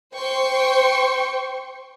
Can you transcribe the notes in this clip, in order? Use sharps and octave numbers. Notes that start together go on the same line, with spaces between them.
C5 G5 C6 C#6